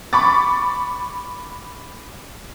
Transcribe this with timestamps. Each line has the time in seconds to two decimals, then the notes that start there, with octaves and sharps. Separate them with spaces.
0.13 B5 C#6 D6 A6